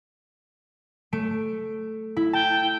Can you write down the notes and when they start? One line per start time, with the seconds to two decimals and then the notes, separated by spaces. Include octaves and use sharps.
1.13 A3 D7
2.17 E4
2.33 G5 A5